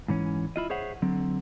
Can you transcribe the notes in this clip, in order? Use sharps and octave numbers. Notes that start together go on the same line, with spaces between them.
G#2 E3 C#4
E4 F4 D#5
G#4 C5 C#5 E5 F#5
D3 F#3 C4